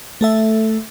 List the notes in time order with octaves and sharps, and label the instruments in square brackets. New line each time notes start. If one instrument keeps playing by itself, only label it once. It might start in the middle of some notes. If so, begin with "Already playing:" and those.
[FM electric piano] A3 A4 E5